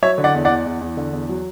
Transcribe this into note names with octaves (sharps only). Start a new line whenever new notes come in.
F#3 C#5 E5
D3
D5 F#5
E2
D5 F#5
E2
E2
E2
D3
E2
F#3